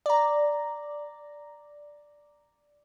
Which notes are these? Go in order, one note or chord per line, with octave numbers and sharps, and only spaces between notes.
D5 A#5